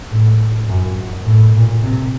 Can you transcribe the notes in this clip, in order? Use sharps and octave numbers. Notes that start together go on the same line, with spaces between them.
A2
F#2
A2
A#2
C3